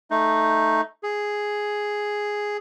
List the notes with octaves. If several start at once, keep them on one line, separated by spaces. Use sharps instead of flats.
A3 D#4
G#4